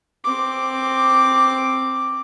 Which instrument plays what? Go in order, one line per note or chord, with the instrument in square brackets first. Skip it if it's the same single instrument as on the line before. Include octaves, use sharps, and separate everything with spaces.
[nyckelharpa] C4 D6